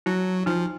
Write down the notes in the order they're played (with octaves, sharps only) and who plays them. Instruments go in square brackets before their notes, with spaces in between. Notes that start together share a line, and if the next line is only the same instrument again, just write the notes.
[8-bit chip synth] F#3 [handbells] E4
[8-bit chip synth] F3 [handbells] D#4